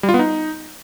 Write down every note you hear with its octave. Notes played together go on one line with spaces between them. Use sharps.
G3
F4
B3
D#4